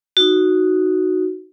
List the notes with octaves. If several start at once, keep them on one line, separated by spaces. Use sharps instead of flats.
D#4 F#4